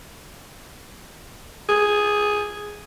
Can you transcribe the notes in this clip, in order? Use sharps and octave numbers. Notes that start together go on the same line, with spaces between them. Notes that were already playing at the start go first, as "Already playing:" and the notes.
G#4